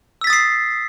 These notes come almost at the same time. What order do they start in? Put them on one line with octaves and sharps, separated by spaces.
E6 B6 A6 D#6 C7